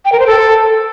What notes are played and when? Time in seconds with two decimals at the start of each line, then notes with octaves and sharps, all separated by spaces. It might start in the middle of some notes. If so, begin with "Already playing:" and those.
0.05 G5
0.12 A#4
0.20 C5
0.27 A4